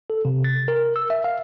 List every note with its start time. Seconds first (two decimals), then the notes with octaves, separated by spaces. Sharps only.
0.10 A4
0.25 C3
0.44 A6
0.68 A#4
0.96 E6
1.10 E5
1.24 F5